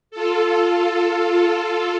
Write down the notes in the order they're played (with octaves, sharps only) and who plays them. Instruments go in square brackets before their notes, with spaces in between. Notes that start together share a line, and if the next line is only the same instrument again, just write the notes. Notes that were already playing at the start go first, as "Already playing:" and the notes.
[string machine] F4 A4